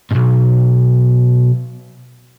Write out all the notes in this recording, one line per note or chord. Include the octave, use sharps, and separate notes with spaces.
B1 G#2